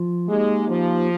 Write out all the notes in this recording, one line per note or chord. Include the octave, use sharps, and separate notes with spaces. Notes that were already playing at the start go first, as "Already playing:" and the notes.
Already playing: F3 F4
G#3 A#3 D#4 G4
F3